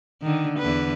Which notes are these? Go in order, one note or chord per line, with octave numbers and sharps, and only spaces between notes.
D3 D#3
E2 D3 B4